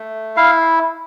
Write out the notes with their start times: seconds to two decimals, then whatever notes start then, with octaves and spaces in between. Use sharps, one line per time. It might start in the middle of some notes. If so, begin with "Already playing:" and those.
Already playing: A3
0.36 E4 F5